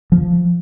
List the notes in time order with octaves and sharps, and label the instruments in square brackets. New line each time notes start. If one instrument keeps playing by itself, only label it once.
[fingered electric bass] F3